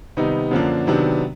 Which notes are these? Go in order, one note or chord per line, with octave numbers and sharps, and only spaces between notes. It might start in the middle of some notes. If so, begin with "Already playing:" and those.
C3 D#3 G3 B3 D#4
F#2 D3 F3 A#3 D4
C3 D#3 F#3 B3 D4